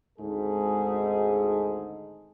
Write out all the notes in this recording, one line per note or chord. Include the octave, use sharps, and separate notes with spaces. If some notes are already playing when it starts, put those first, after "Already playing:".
G#1 D2 G#2 G#3 G#4 A4